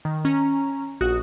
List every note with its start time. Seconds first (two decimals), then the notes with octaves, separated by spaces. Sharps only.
0.05 D#3
0.25 C#4 A#5
1.01 A#1 F#4 D#6 F#6